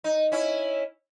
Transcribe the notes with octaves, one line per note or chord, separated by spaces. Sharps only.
D#4
C#4 E4